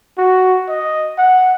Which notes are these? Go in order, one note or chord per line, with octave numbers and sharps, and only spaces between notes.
F#4
D#5
F#5